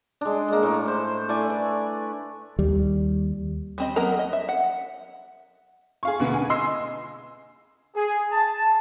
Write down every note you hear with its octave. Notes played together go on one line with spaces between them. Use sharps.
G#3 D4
G#3 A#3
A2
E4 C5
A3 E4 D5 G#5
B4
D#2 G3
G3 C4 D#5
F#3 A#3 B3 A#4 A#5
D#5
E5
F#5
G#4 F5 C#6
B2 D3 A#3 B3
G#5
D#5 C6 E6 C7
G#4
A5